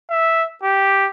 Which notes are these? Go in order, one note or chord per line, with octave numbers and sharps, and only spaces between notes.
E5
G4